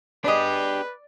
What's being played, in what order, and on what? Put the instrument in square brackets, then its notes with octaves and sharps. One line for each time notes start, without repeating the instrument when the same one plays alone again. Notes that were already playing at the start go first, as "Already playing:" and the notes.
[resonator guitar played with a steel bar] B3 G#4 D#5 [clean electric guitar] D4 G4 [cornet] B4 [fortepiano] D5